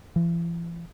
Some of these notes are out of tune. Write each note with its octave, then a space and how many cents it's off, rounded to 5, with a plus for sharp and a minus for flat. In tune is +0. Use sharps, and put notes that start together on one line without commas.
E3 +45